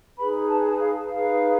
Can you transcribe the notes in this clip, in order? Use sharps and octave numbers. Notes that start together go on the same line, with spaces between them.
D#4 G#4 B4 B5
A5
G#5
A5
F5
D#4 G#4 B4 F5